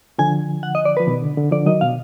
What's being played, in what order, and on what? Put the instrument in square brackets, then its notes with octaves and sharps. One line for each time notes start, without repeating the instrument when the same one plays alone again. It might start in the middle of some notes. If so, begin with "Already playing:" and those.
[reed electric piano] D3 F3 [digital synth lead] G#5
[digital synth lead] F#5
D#5
D5
[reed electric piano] F3 [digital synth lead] B4
[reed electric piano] B2 D#3
D3
D3
[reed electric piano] D3 F3 [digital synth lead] D5
[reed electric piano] D#3 F#3 [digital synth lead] D#5
[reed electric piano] B2 [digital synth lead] F5